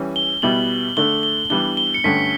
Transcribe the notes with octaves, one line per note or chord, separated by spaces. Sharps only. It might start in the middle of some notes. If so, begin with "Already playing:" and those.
Already playing: E3 G3 C#4
G7
B2 G3 B3 E4 G4 F#7
D3 A3 D4 A4 G7
G7
E3 G3 B3 D4 G7
G7
C#7
G2 D3 A3 C#4 B6